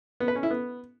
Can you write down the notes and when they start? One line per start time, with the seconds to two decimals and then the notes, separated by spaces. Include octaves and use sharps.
0.20 B3
0.28 B4
0.36 C#4
0.43 E4
0.51 B3